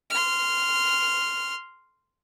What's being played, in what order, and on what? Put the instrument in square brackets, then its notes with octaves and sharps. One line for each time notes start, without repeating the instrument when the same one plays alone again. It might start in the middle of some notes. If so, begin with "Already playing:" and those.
[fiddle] C6 F6